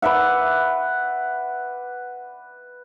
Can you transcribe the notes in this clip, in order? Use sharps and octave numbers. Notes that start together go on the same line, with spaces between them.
B4 D5 E5 F#5